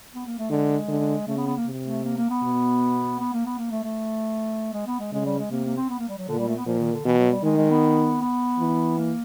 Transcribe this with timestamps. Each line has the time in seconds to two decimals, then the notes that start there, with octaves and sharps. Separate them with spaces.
0.15 B3
0.26 A#3
0.39 A3
0.50 D3 G#3
0.88 D3
1.27 C#3 A3
1.37 B3
1.47 B3
1.57 A#3
1.66 C3
1.85 A3
2.04 A#3
2.17 A#3
2.30 B3
2.43 B2
3.20 B3
3.33 A#3
3.46 B3
3.58 A#3
3.71 A3
3.84 A3
4.73 G#3
4.87 B3
5.00 G#3
5.12 C#3 G#3
5.25 G3
5.38 G#3
5.51 C3 A#3
5.65 A#3
5.76 C4
5.89 B3
5.99 A#3
6.09 G3
6.18 F#3
6.28 A#2 D3
6.38 G3
6.47 A3
6.57 B3
6.66 A#2 F3
6.79 D#3
6.93 D3
7.05 B2 E3
7.18 F#3
7.31 G3
7.44 D#3 G#3
7.57 G#3
7.70 B3
8.21 B3
8.59 E3
8.98 A#3